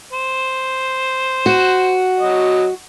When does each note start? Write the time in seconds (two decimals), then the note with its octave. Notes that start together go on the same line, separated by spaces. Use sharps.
0.13 C5
1.46 F#4
2.20 F#3 D#5